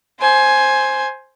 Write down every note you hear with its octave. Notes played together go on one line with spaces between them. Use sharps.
C5 G#5